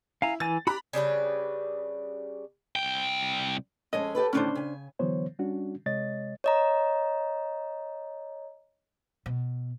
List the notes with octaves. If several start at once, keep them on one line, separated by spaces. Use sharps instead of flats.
E4 F5 G#5 A#5
E3 G#5 A6
F#4 G4 A#5 B5 F#6
C#3 G3 D4 B4
C2 G5
F2 G#3 C#4 D#5
G4 A4 B4
A2 D3 D#3 C#4 D4 C5
C#3 G#5
D3 E3 F#3 B3 C5 C#5
G3 C#4 D4 F#4
C3 G#3 C#5 D#5 A6
C#5 D#5 A#5
B2